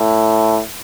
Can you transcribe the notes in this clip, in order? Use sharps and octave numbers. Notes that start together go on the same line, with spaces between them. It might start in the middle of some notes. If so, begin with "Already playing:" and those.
Already playing: A2